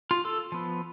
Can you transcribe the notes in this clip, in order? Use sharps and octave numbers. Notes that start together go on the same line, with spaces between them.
F4
A4
F3 B3